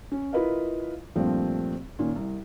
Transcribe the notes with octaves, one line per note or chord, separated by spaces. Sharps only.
C#4
E4 F4 A#4 B4 D#5 F5
G2 A#2 F3 A3 C4
A#2 D#3 C#4
C2